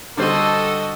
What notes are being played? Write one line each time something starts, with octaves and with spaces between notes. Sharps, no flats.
D3 G3 F#4 A4 C5 D#5